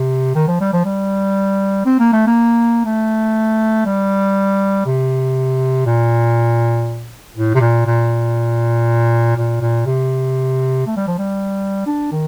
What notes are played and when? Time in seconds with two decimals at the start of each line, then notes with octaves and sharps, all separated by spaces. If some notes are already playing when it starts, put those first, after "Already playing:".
Already playing: C3
0.35 D#3
0.48 F3
0.60 G3
0.73 F3
0.85 G3
1.86 C4
1.99 A#3
2.12 A3
2.27 A#3
2.85 A3
3.86 G3
4.86 C3
5.86 A#2
7.36 A2
7.55 C3
7.60 A#2
7.86 A#2
9.37 A#2
9.61 A#2
9.86 C3
10.86 A3
10.97 G3
11.07 F3
11.18 G3
11.87 D4
12.12 D#3